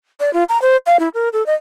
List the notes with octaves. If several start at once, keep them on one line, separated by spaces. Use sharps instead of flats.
D5
F4
A#5
C5
F5
E4
A#4
A4
D#5